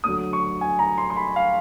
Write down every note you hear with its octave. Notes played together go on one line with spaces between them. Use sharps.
D2 D3 F#3 D#6
C#6
G#5
A#5
C6
C6
B5
F5